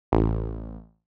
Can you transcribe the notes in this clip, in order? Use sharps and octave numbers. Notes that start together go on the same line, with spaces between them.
A1